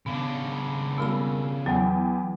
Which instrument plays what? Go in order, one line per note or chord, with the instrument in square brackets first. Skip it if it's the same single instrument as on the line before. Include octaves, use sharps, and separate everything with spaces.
[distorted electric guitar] C#3 D4 [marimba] B3
[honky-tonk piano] G3 A#3 E6 [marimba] B3 F4 B5
[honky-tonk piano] E2 G5 [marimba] F#3